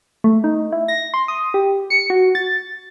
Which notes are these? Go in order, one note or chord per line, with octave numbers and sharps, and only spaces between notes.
A3
D#4
E4
A#6
C6
D#6
G4
C#7
F#4
A6